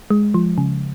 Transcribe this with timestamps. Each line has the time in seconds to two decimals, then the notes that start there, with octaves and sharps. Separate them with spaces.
0.10 G#3
0.34 F3
0.58 C#3